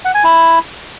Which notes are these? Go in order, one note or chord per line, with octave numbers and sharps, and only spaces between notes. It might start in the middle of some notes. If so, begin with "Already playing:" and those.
F#5
G#5
E4